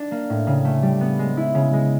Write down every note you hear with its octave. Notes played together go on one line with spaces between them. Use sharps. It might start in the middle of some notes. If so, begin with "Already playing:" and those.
Already playing: D4
A#3
A2
C#3
A3
G3
B3
G#3
E4
C#3
G#3